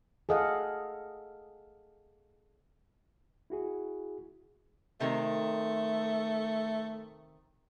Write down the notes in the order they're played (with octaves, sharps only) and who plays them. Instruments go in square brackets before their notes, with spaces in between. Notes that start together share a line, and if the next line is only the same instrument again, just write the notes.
[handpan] G#4 A4 D#5 F5 F#5
[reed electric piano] E4 F#4 G#4
[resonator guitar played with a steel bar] C3 D#3 [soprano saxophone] A3